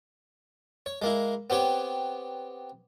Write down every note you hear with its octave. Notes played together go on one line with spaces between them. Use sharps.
C#5
G#3 A#3 E4
B3 C4 G4 C#5